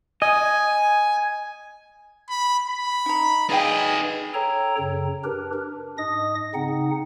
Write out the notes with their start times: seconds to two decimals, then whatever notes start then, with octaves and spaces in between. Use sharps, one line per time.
0.22 D#5 G#5
2.30 B5
2.68 B5
3.06 D#4 A#5
3.49 D#4 G#4 B4 D5 F5 G5
4.34 A4 C#5 G5 A#5
4.78 F#2 C#3
5.24 D4 G4 A#4 B4
5.53 D4
5.98 G#2 D#5 D#6 A#6
6.54 C#3 C4 D#4 F#5